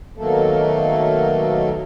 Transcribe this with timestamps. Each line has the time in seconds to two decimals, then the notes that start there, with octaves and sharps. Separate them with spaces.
0.17 B2 D#3 F#3 A3 A#3 A4